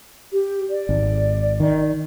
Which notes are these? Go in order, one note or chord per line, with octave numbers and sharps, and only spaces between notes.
G4
D5
G#1
D#3